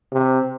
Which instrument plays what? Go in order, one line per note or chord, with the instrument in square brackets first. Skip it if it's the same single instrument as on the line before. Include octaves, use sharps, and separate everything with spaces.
[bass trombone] C3